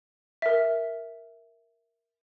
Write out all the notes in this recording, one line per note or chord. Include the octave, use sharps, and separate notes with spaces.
A#4 E5